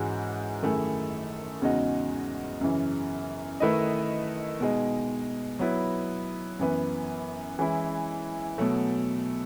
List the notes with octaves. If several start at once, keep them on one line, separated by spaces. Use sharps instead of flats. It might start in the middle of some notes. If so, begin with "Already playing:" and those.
Already playing: G#2 E3 G#3 C#4 F#4
F#2 D#3 A3 E4 G#4
E2 C#3 G#3 D#4 F#4
F#2 C#3 E3
D#3 A3 E4 B4 D#5
B2 G#3 D#4
F#3 B3 E4
F#2 E3 B3
E3 G#3 C#4 E4
B2 F#3 A3